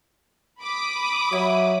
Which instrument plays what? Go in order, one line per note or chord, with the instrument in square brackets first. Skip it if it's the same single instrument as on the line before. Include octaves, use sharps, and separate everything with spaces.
[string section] B5 D6 D#6
[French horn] F#3 [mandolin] E4